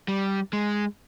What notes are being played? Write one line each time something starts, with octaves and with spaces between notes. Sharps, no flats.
G3
G#3